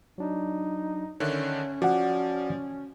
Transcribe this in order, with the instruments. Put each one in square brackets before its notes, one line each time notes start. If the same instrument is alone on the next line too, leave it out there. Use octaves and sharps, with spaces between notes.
[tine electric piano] F#3 D4 [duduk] D#4
[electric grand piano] D3 D#3 D4 [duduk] C#4 [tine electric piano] C#5 E5 F#6
[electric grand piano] F3 [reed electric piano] F#4 F#5 [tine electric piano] D5